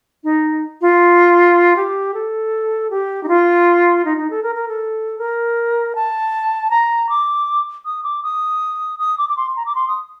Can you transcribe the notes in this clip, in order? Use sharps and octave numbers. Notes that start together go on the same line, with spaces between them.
D#4
F4
G4
A4
G4
D#4
F4
D#4
D#4
A4
A#4
A#4
A4
A#4
A5
A#5
D6
D#6
D6
D#6
D#6
D6
D6
C6
A#5
D6
C6
D#6